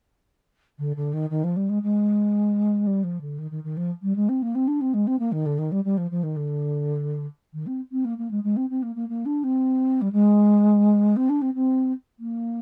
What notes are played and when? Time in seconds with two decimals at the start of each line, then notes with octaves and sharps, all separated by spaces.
0.78 D3
0.96 D3
1.13 D#3
1.30 D#3
1.43 F3
1.56 G3
1.69 G#3
1.82 G#3
2.86 G3
3.03 F3
3.21 D3
3.38 D#3
3.51 D#3
3.63 D#3
3.77 F3
4.02 G3
4.15 G#3
4.28 C4
4.42 A#3
4.55 C4
4.67 D4
4.80 C4
4.93 G#3
5.07 C4
5.19 A#3
5.32 D#3
5.45 D3
5.58 D#3
5.71 G3
5.84 G3
5.97 F3
6.10 F3
6.23 D#3
6.36 D3
7.53 D#3
7.66 C4
7.91 C4
8.04 A#3
8.18 A#3
8.30 G#3
8.43 G#3
8.56 C4
8.69 C4
8.82 A#3
8.95 A#3
9.08 A#3
9.25 D4
9.43 C4
10.01 G3
10.12 G#3
11.16 C4
11.29 D4
11.41 C4
11.54 C4
12.19 A#3